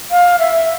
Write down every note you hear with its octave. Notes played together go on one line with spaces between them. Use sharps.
F5
E5